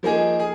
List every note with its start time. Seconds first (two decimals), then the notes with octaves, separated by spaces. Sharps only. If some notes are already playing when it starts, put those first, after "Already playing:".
0.03 F3 A#3 D#4 G#4
0.39 G#4